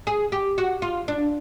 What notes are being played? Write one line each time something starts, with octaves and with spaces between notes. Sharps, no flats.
G#4
G4
F#4
F4
D4